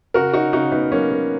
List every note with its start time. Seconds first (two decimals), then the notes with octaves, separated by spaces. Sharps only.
0.14 C#3 F#4 A#4
0.33 D#4 F#4
0.53 C#3 D#4 F#4
0.72 B3 D#4
0.92 F#3 A#3 C#4
1.11 A#3